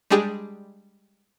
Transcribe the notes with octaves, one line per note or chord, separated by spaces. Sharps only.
G3 G#3 D4 G4 G#4